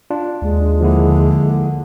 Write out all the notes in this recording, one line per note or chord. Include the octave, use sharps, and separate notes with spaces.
D4 F4
D#2 G#3
D3 F3 A#3 E4